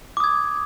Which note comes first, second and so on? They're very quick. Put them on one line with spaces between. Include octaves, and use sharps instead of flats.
D6 D#6 G#6